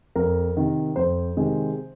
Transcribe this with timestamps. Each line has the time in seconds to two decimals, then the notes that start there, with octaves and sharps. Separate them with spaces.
0.15 F2 A#4
0.57 C3 D#3
0.96 F2 C5
1.37 C3 D#3 G#3